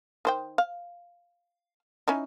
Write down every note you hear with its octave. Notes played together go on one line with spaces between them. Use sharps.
D#3 C5 G5
F5
C#4 D#4 E4